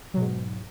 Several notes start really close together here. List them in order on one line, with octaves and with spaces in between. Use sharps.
F#3 B2 G#2